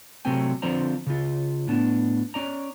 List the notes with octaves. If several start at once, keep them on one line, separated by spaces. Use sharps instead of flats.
C3 F#3 A3 C4 G5 G#5
D3 F3 C4 C5 D5 A#5
C#3 F4
A2 B3 D4
C#4 D5 A#5